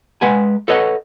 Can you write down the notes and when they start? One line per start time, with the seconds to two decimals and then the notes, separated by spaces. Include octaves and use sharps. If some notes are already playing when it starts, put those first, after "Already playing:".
0.21 G#3 B4 F#5 G#5
0.68 A4 B4 C#5 D#5 F#5